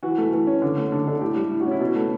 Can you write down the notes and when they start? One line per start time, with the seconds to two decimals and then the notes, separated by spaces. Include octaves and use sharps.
0.03 E3 F#4
0.18 A3
0.33 E3
0.47 C#4
0.62 D3
0.77 A3
0.92 D3
1.07 D4 A4
1.21 A2 G4
1.36 G3
1.51 A2
1.60 F#4
1.66 C#4
1.71 E4
1.80 B2
1.96 A3